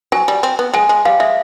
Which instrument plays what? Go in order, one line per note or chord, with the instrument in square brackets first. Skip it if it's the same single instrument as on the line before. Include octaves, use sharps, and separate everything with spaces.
[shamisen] F#3 [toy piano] G#5
[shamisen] G3
C4
B3
[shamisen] G#3 [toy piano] G#5
[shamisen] G#3
[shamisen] G3 [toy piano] F5
[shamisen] G#3 [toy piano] E5